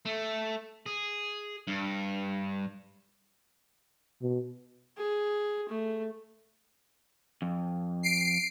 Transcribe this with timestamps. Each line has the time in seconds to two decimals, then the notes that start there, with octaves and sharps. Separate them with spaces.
0.05 A3
0.86 G#4
1.67 G2
4.22 B2
4.97 G#4
5.69 A3
7.42 F2
8.03 C7 D7